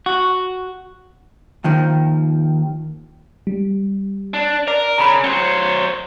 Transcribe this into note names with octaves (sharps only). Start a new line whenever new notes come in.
F#4
D#2 D#3 F3
G3
D4
A#4 D5
C#3 A#5 B5
F#3 C5 C#7